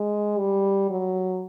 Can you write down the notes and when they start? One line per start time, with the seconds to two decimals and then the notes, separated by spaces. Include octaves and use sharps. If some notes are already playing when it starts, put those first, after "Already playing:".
Already playing: G#3
0.38 G3
0.90 F#3